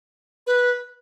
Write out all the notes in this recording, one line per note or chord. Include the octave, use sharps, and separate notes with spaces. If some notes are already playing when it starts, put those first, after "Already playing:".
B4